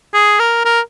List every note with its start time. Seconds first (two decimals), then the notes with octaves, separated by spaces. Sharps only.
0.14 G#4
0.39 A#4
0.65 A#4